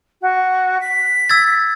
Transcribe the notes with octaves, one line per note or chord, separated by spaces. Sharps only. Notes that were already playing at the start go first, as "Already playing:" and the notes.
F#4
B6
E6 G#6 A6